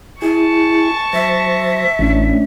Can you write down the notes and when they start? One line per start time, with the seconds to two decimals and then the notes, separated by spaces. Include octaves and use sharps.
0.22 E4 G#4 G#5 A5 C#6
1.13 F#3 C5 E5 A#6
1.99 A1 A3 C#4 D4